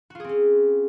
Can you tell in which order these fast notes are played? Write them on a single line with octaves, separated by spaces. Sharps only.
F#4 F4 G#4 C4 C#4